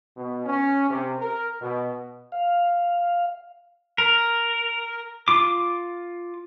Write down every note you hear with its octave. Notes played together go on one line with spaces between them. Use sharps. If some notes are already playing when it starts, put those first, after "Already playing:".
B2
C#4
C3
A#4
B2
F5
A#4
F4 D6